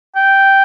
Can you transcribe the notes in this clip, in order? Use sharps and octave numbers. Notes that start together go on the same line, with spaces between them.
G5